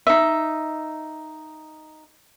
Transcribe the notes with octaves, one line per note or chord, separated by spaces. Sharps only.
D#4 E5